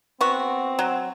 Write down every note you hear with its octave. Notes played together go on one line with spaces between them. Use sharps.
B3 C4 F#4
F#3